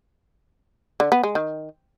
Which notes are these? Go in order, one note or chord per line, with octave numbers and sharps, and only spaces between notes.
D3
B3
G#3
D#3